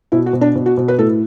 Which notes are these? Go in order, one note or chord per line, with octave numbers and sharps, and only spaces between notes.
B2 E4
F#4
B2
D4
B2
F#4
B2
B4
A2 A4